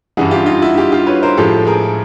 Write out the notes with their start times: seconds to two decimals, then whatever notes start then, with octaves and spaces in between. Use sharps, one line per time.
0.17 G2 E3 G3 F#4 G#4
0.31 F4 G4
0.46 D#4 F4
0.62 E4 F#4
0.77 F4 G4
0.92 F4 G4
1.07 B4 C#5
1.23 A#4 C5
1.37 A2 F3 G#3 G4 A4
1.67 G#4 A#4